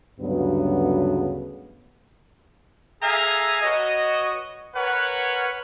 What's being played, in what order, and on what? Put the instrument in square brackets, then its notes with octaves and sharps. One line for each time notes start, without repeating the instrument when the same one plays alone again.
[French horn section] D2 G2 C#3 F#3 B3
[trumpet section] G#4 A4 E5 F5 G#5 A#5
F#4 B4 C#5 D#5
A#4 B4 C#5 F#5